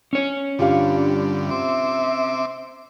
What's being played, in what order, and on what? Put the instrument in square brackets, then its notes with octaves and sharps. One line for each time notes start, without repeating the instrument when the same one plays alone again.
[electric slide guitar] C#4 C#5
[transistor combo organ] G2 D3 [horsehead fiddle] G3 D4 [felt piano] F4 G4 F5
[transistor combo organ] C4 D6 [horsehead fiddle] E5